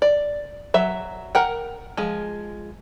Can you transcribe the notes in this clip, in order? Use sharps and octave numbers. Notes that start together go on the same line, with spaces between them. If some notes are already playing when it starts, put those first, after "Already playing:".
D5
F#3 E5
A#4 F#5 G5
F3 G#3